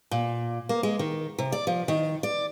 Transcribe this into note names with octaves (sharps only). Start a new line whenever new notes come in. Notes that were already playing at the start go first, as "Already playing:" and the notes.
A#2
A#3
G#3
D#3
C3
D5
F3
D#3
D5